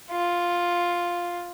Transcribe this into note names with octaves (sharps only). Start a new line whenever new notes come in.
F4